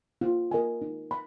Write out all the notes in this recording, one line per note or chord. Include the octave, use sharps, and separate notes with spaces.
F4
A#4 D#5 G#5
D#4
B5